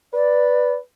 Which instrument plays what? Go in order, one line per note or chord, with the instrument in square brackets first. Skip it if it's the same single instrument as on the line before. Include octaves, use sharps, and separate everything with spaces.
[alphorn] B4 [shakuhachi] D5